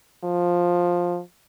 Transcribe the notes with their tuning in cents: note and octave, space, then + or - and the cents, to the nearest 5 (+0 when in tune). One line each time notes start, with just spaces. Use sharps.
F3 +10